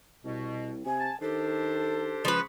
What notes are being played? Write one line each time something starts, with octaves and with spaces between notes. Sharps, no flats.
C2 B2
C3 G#5
A5
D#3 D4 G4 A4 C5
C#2 F3 G#4 B4 B5 C#6